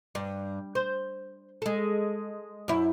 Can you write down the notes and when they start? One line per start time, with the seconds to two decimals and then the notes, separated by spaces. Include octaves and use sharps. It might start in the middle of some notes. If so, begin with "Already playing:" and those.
0.15 G2
0.75 C5
1.62 G#3 A4
2.68 F#2 E4